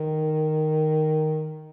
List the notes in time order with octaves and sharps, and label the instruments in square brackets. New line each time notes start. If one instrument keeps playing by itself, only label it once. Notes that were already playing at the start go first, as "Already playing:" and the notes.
Already playing: [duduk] D#3